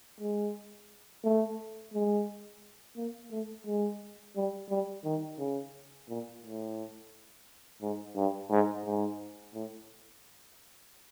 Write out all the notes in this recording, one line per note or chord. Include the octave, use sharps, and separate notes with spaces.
G#3
A3
G#3
A#3
A3
G#3
G3
G3
D#3
C#3
A#2
A2
G#2
G2
G#2
G#2
A2